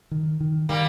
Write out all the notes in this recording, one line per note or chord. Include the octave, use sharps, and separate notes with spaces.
D#3
D#3
D#3 G3 A#3